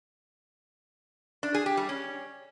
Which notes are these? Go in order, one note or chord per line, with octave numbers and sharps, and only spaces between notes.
D4
G#4
G4
G3
C#4